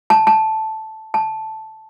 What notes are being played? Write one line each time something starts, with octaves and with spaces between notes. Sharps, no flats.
A5
A5
A5